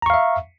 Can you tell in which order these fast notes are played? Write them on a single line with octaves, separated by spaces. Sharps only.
A#5 C#6 F5 E5